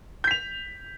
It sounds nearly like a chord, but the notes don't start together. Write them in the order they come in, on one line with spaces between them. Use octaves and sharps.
G6 B6 F7